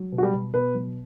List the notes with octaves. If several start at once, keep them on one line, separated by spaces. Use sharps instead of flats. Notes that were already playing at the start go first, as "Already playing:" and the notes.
Already playing: F#3
B2
F#4
G3 G4
B2
B2 B3 B4
F#3